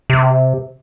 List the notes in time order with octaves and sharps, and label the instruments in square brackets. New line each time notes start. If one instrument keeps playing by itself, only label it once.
[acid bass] C3